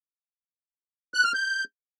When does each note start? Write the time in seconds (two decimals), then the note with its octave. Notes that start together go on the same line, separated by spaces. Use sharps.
1.14 F#6
1.24 F6
1.34 G6